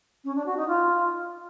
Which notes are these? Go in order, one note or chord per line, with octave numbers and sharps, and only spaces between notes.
C#4
D4
F#4
D#4
F4